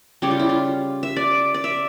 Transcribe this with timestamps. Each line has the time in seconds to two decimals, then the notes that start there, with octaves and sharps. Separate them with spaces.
0.22 C#3 G3 C#4 G4
0.31 F4
0.39 E4
0.49 F4
1.03 E5
1.16 D5
1.54 D5
1.64 E5